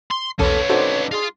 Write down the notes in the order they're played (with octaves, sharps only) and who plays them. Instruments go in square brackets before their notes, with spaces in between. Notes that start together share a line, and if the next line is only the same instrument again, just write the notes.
[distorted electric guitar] C6
[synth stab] B1 E2 [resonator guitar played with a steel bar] A#3 A4 [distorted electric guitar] C#4 B4 [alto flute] C#5
[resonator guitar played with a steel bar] C4 D4 D#4 [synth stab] F#4 A4 C5
[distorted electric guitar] F4 C6 [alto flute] G#4